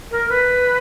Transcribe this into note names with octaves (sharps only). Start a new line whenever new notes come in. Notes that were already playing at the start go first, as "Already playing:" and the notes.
A#4
B4